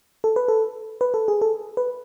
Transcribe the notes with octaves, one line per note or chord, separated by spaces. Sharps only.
A4
B4
A4
B4
A4
G#4
A4
B4